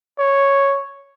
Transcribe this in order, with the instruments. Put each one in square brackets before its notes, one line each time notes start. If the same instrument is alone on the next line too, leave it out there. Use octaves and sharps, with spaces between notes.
[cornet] C#5